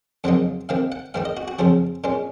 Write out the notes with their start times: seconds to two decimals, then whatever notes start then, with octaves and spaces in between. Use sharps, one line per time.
0.24 F2 C#3 F#3 A#3 D#4 F#5
0.69 C3 D#3 A#3 F5
0.92 F#5
1.14 G#2 D#3 A#3 F5
1.25 D#5
1.37 F#4
1.48 F#4
1.59 F2 C#3 F3 G#4
2.04 A#2 G#3 C#4